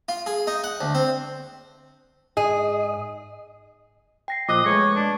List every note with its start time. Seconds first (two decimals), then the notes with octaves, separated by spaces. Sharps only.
0.09 F4
0.26 G#4
0.47 D#4
0.64 F#5
0.81 D2
0.95 C4
2.37 G#2 G#4 D#5
4.28 G5 A#6 C7
4.49 A#2 F3 D#5 D6 D#6 F#6
4.66 G#3 A3 B4 C#5
4.96 D4